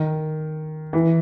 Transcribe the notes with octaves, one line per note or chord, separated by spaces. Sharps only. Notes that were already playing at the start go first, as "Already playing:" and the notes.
Already playing: D#3
E3